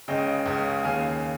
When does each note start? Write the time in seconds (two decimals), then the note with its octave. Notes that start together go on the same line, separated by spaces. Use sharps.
0.08 C#2 C#3 D#5 G5
0.46 C#2 C#3
0.83 D#2 C#3 F5 G#5